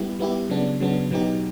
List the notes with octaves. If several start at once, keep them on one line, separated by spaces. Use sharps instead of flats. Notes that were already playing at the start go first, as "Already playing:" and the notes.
Already playing: G3 B3 E4 G4
G3 B3 E4 G4
C#3 F#3 B3 D4
C#3 F#3 B3 D4
B2 F#3 B3 D#4 G4